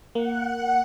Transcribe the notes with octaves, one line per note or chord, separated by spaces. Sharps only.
A#3 F#5